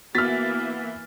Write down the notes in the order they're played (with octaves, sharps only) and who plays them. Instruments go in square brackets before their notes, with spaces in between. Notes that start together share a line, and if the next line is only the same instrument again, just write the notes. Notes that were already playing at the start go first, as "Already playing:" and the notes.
[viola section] E3 A#3 E5 [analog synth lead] B3 [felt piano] F#4 F6 [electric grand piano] A6 B6